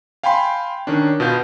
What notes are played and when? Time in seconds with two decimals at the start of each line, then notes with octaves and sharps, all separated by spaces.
0.23 F5 G5 G#5 B5 C6
0.87 D#3 C#4 D4
1.20 B2 B3 F4 G6